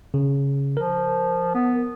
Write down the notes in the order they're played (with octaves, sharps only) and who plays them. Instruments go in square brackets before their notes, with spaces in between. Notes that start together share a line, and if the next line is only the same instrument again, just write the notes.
[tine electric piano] C#3
[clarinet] F3 [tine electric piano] A#4
[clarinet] B3